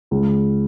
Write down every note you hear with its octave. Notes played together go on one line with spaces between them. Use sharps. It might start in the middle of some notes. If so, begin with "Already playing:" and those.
C#2